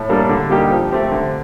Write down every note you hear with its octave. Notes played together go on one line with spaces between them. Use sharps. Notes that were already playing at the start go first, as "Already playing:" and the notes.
Already playing: A2
G3 A#3 D4 A4
D3
G3 A#3 D#4 G4
F3
A3 C4 G4
D3